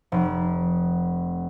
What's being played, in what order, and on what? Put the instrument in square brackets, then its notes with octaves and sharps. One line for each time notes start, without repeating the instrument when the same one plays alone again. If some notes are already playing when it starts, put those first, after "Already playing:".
[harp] F1